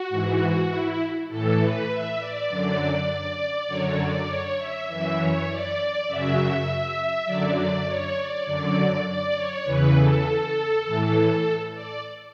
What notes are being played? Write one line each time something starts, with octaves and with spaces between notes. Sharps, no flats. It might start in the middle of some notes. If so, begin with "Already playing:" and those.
Already playing: F#4
G#2 E3
E4
A2 E3 A4
B4
E5
D5
F#2 D3 F#3
F#2 D3 F#3 C#5
D5
C#5
E5
F#2 E3 E5
C#5
D5
F#2 C#3 F#3 E5
F#2 D3 F#3 D5
D5
C#5
D5
F#2 D3 F#3 D5
D5
C#5
E2 C#3 E3 B4
A4
A2 E3
D5